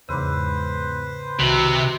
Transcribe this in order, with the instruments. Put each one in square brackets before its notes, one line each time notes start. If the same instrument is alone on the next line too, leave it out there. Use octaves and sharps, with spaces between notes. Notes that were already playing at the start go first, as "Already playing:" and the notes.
[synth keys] E2 G#2 [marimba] C#3 D6 [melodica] B4 C5
[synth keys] C2 [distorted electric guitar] C3 [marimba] D#3 F#4